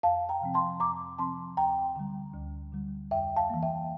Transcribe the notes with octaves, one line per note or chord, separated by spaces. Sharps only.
F2 F5 A5
G5 A#5
C3 F3 C4
A5 C6
F2 A#5 D6
C3 F3 C4 A5 C6
D2 G5 A#5
D3 G3
D2
D3 G3
F2 E5 G5
F5 A5
E3 A#3
E5 G5